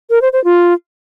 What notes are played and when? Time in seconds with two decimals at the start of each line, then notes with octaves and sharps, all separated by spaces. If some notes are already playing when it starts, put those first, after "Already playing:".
0.10 A#4
0.22 C5
0.33 C5
0.44 F4